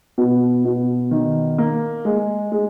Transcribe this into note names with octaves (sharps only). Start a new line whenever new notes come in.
B2
B2
D#3
A#3
G#3
G#3